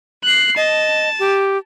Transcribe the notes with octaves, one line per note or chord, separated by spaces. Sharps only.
F#6 C7
D#5 A5
G4